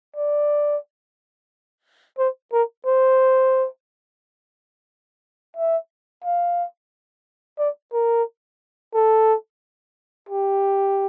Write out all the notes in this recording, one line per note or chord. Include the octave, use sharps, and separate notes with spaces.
D5
C5
A#4
C5
E5
F5
D5
A#4
A4
G4